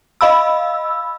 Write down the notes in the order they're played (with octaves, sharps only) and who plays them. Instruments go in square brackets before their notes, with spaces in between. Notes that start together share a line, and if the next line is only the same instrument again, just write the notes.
[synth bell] D#5 F5 B5 E6